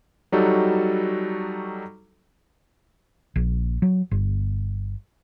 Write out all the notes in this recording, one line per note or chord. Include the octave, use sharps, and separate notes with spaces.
F#3 G3 D#4 F#4 A4
A#1
F#3
G1